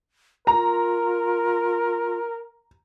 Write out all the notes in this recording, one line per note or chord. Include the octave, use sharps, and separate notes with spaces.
F4 A#4 A#5